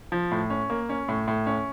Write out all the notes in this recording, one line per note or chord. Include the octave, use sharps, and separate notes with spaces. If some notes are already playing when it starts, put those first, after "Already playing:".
F3
A2
C#4
A#3
C#4
A2
A2
C#4